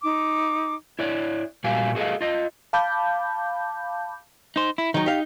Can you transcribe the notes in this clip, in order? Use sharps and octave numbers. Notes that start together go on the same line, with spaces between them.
D#4 D6
E4 C#5 D5
A#2 G3 F#4 G4 F5 G#5
F#4 G#4 A4 D#5 F5
F4 D#5
F5 A5 B5 D6 G6
D#4 C5
E4
D#3 F#3 D#4
G4 F5